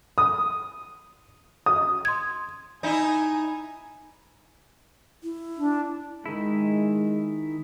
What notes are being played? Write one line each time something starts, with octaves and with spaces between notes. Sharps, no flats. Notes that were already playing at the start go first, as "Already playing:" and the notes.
D#6
D#6
C6 G#6
D#4 E4 G#5
E4
D4
D#3 G#3 E4